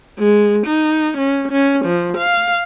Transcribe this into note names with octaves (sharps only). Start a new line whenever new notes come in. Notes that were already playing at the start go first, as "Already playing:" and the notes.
G#3
D#4
C#4
C#4
F3
F5